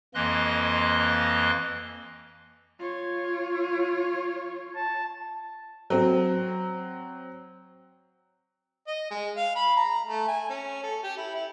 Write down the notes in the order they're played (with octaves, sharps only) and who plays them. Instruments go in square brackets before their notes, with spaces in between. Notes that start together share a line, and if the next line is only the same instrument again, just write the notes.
[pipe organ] F2 E3 A#3 D#5 C6 F#6
[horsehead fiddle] F4 C#5
[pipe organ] A5
[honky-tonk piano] F#3 C4
[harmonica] D#5
G#3
F5
B5
A#5
A3
G#5
C#4
A4
G4
E4
E4